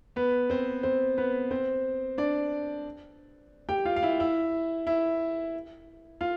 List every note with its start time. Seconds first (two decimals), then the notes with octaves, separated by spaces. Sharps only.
0.16 B3 B4
0.50 C4 C5
0.83 C4 C5
1.18 B3 B4
1.51 C4 C5
2.18 D4 D5
3.69 G4 G5
3.85 F4 F5
3.96 F5
4.03 E4 E5
4.20 E4 E5
4.87 E4 E5
6.21 F4 F5